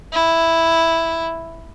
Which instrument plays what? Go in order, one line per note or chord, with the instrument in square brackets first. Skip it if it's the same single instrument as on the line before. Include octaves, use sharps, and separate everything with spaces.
[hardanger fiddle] E4